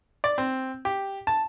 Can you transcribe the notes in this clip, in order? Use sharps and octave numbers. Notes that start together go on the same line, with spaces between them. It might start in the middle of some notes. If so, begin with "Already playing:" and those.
D5
C4
G4
A5